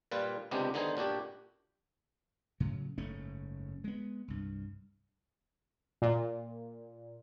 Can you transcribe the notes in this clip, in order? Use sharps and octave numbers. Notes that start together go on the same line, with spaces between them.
A#2 G3 F4 B4
C#2 C3 G#3 B3 D4 G4
D3 D#3 B3 D#4 G#4 C5
A#2 D4 F#4 G4
A2 C#3 F#3
F#1 G#2 A3 C#4
G#3 B3
C2 G2
A#2